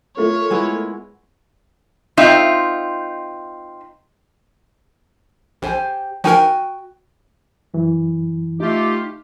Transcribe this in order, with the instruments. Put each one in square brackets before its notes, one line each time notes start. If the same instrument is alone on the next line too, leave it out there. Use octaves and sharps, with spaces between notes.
[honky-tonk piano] A3 F4 A#4 [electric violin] C#5
[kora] G#3 B3 E4
[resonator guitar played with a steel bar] C4 D#4 F4 E5
[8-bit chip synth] A#1 [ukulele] G4 C5 G#5
[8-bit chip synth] F3 D#4 A#4 [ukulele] F#4 G5 G#5
[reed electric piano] F#2 E3
[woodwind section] A3 F4 G4 [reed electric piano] D#4